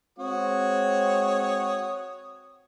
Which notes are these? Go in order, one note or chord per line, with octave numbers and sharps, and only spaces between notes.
G#3 C4 F#4 C#5 D#6